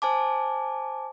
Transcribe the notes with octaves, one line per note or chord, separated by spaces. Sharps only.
C5 G#5 A5 D6